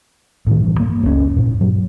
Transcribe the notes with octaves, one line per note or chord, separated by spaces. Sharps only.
A2 D#3
G2 E3
A#3
F#1 C#2 C#3 C#4
G2 A#2
F#3